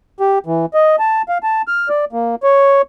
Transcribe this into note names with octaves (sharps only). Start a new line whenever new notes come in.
G4
E3
D#5
A5
F5
A5
F6
D5
A#3
C#5